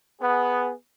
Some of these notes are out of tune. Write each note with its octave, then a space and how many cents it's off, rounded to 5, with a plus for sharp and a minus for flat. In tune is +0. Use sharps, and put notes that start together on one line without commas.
B3 +0 G#4 +0